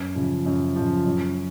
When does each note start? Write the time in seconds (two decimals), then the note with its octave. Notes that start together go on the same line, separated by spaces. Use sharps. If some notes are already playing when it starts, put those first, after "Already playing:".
Already playing: F#2
0.15 C#3 F3
0.46 F#2
0.76 C#3 F3
1.06 F#2